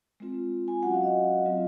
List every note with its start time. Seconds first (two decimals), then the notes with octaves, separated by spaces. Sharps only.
0.20 G#3 C4 F4
0.68 G#5
0.83 F#3 C#4 F#4 F#5
0.94 F5
1.03 D#5
1.45 F#3 C4 F4